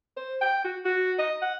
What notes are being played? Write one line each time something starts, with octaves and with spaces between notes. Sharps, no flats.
C5
G5
F#4
F#4
D#5
F#5